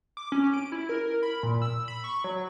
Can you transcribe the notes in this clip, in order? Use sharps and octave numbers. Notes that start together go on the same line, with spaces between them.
D6
C#4
D7
E4
A#4
B5
A#2
E6
B5
C#6
F#3